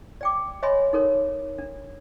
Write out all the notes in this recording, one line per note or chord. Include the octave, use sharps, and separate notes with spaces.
D5 G5 D6
C#5 D#5 E5 G#5 B5 C6
D#4 A4 A#4 C#5
D4